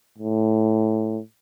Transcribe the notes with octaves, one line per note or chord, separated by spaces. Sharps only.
A2